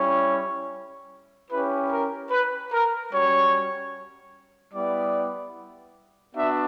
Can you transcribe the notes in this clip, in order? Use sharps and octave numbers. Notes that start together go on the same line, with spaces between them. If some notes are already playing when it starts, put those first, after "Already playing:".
Already playing: G3 C#4 E4 C#5
C#4 E4 G4 B4
A#4
B4
A#4
G3 C#4 F#4 C#5
G3 B3 E4 D5
B3 D4 F#4 E5